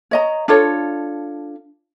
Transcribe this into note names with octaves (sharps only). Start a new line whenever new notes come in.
C#5 D#5 A#5
D4 F4 A4 C#5